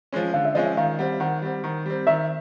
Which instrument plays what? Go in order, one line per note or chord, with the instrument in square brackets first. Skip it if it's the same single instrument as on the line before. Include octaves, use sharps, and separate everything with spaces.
[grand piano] F3 G#3 C#4
[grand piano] D3 [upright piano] F5
[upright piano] E5
[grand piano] F3 G#3 C#4 [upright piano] D#5
[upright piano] E5
[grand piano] D#3 [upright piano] F5
[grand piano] G3 C4 [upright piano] F#5
[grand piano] D#3 [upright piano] F#5
[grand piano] G3 C4
D#3
G3 C4
[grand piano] D#3 [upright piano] E5